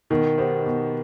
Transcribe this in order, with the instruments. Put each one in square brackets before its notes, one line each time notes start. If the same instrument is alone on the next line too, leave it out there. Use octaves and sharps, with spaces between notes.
[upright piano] B2 [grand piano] D#3
[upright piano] B3 D#4 G4 C5
B2